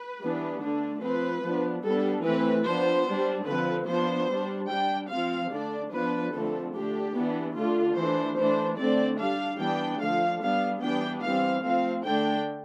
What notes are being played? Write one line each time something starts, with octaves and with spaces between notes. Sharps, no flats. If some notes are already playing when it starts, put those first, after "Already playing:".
Already playing: B4
E3 G3 B3 D4
D3 A3 D4
F3 C4 B4
F3 B3 D4
G3 B3 D4 A4
E3 A3 C4 B4
F3 B3 D4 C5
G3 D4
D3 F3 C4 B4
F3 B3 D4 C5
G3 D4
G3 D4 G5
F3 C4 F5
D3 A3 D4 D5
F3 B3 D4 B4
D3 F3 A3 C4 A4
D3 A3 D4 G4
E3 B3 D4
D3 A3 D4 F4
E3 A3 D4 C5
E3 A3 D4 C5
D3 A3 C4 D5
G3 D4 F5
E3 G3 B3 D4 G5
D3 F3 A3 F5
G3 B3 D4 F5
E3 G3 B3 D4 G5
E3 G3 C4 F5
F3 A3 C4 F5
D3 A3 D4 G5